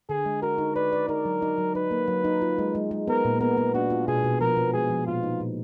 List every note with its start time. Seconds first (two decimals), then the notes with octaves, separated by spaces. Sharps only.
0.09 D3 G#4
0.25 G#3
0.42 F#4 A#4
0.58 D#4
0.76 B4 D5
0.93 D5
1.09 D#4 A#4
1.25 F#3
1.42 D#4
1.58 F#3
1.75 D#4 B4
1.91 A#3
2.08 F#3
2.24 D#4
2.42 F4
2.59 G#3
2.75 G#3
2.91 G#3
3.08 B3 A#4
3.25 A#2
3.40 B3 A#4
3.57 B3
3.74 D4 F#4
3.90 F4
4.07 B2 G#4
4.24 B2
4.41 F3 A#4
4.57 B3
4.73 G#3 G#4
4.90 F3
5.06 A#2 F4
5.23 D#4
5.40 A#2